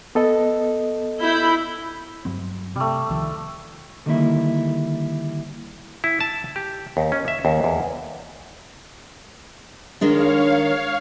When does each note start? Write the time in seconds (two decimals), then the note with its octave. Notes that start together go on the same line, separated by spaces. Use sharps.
0.15 B3 A4 D#5
1.20 E4 B5 G6
2.25 G2 F#3 C4
2.76 C3 G3 A3
3.10 C2 D#3 F3
4.06 D3 D#3 G3 A#3 E4
6.04 E4
6.21 A5
6.56 G4
6.97 D#2
7.12 C#4
7.28 E5
7.45 D#2
7.64 E2
10.01 D#3 G#3 D4 C#5 F5